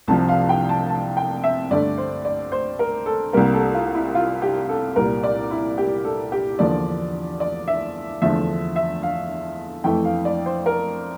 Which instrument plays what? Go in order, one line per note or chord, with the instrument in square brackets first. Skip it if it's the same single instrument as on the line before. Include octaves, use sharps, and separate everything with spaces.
[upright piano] C2 C3 F3 A5
F5
G5
A5
A5
G5
E5
G2 D3 A3 D5
C5
D5
C5
A#4
A4
C2 C3 G3 A#3 A#4
A4
F4
E4
F4
G4
A4
C2 A#2 G3 A#4
D5
E4
G4
A4
G4
E2 D3 F3 A#3 D5
D5
E5
E2 D3 F3 A3 E5
E5
F5
F2 E3 A3 G5
F5
D5
C5
A#4